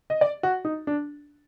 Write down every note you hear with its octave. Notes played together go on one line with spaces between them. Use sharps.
D#5
D5
F#4
D#4
D4